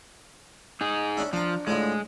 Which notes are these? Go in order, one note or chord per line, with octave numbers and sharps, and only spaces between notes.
D#4 G#4
C#4 D4 E4
F3 D4 A#5
A2 D3 F3 G#3